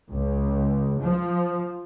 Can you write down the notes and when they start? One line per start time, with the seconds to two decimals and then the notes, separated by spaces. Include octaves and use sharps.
0.11 C#2
1.01 F3